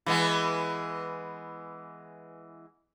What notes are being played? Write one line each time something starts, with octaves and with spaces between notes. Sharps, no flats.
E3 G#3 B3